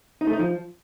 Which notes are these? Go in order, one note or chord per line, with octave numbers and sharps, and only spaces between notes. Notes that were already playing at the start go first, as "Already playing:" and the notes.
D#4
A3
D#4
F3